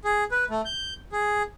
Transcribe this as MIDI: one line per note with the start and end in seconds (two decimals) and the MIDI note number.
0.04 0.24 68
0.31 0.44 71
0.50 0.61 57
0.65 0.94 91
1.12 1.43 68